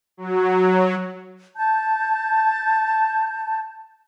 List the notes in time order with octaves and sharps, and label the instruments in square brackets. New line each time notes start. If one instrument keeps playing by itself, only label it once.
[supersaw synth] F#3
[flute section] A5 G6